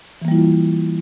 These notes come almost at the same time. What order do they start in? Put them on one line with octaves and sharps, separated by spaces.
E3 A#3 G3 E4 F4